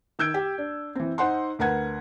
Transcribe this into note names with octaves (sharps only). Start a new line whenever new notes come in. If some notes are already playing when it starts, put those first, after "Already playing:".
D#3 E6 G6 G#6 D7
G4
D4
E3 C4
D#4 C5 F#5 C6
D2 A#4 B4 F#5 G#6